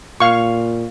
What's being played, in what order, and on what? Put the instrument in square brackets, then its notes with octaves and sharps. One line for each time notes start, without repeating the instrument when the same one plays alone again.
[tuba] A#2 [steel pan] F5 C#6